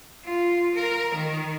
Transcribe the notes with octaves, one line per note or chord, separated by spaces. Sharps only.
F4
A#4
D#3